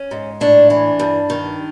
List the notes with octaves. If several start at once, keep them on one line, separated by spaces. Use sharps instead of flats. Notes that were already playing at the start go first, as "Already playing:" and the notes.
Already playing: C#4
G#2
A2 D4
E3
G2
D#3